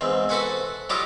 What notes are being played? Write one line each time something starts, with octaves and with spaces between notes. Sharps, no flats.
E2 G#2 C4
F#4 A4 B4 C5 F#5 G#5
F#3 G3 E4 F4 D#5 D6